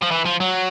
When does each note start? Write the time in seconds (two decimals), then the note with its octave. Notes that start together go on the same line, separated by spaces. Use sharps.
0.02 F3
0.11 E3
0.26 F3
0.40 F#3